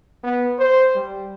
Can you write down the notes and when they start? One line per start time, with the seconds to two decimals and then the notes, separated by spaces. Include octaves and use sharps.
0.24 B3
0.59 C5
0.96 G3